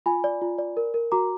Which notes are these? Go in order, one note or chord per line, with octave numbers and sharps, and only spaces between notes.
F4 G#5 B5
D5
F4
D5
A#4
A#4
F#4 A#5 D6